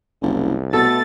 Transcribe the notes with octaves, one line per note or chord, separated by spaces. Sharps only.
F#1 C2
B2 A3 B3 A4 A6